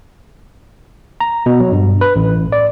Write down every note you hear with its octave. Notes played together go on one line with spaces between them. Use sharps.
A#5
B2
F#3
G2
B4
A1
D5